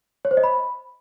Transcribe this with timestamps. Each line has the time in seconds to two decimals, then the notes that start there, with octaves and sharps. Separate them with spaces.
0.25 C#5
0.31 C5
0.37 D#5
0.44 B5